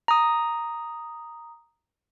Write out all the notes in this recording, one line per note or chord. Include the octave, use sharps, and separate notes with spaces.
A#5 D#6